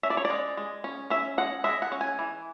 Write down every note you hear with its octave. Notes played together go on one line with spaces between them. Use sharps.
C#4 E5
D5
C#5
D5
G#3
G#3
C#4
C#4 E5
G#3 F#5
G#3 E5
F#5
C#4
G#5
E3